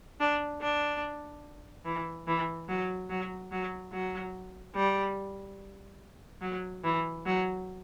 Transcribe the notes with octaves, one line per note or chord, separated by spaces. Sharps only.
D4
D4
E3
E3
F#3
F#3
F#3
F#3
G3
F#3
E3
F#3